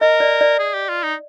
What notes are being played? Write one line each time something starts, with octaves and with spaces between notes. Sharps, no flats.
A#4 D#5
D5
D5
G#4
G4
F4
D#4